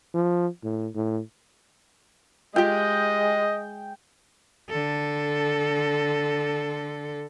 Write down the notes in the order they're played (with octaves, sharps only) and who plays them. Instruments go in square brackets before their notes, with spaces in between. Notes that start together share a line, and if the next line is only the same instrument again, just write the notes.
[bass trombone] F3
A2
A2
[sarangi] G#3 [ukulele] F4 G4 [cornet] D#5 [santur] G5
[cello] D3 A4